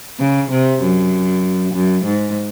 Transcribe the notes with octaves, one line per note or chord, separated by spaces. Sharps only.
C#3
C3
F#2
F#2
G#2